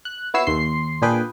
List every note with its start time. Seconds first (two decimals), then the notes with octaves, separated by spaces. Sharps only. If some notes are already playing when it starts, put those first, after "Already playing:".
0.05 F#6
0.34 B3 E4 F#4 C#5 E6 C7
0.47 D#2 C6 C7
1.02 A#2 D4 G#4 B4 G5